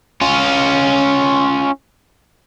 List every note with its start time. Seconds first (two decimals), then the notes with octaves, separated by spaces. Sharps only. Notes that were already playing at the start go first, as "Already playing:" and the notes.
0.21 C#4 F4